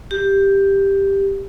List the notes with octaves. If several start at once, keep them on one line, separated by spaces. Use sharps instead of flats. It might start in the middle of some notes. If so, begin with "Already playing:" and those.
G4